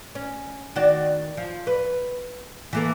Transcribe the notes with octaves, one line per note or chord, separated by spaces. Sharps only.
C#4
D#3 F#4 D5
F3
B4
E3 A#3 A4